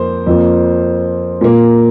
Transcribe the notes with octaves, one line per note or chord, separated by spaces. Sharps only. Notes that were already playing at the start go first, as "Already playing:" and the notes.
Already playing: F2 A#3 C5
F2 F3 A#3
A#2 A#3